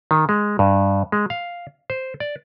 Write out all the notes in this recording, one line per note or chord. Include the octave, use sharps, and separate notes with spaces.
D#3
G#3
G2
G#3
F5
C5
D5